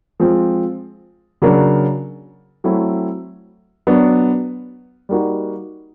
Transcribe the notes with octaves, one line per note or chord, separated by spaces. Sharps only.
F3 G#3 C4
C#3 F#3 A#3 D4
F#3 A3 C4 E4
F#3 B3 D4
G3 A#3 D#4 F#4